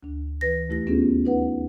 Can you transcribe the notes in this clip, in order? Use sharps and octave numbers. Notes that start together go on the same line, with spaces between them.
D2 D4
E3 B4 A#6
D#2 A3 E4 G4 A#6
B3 C#4 D4 F4 G4 G#4
D#4 B4 F#5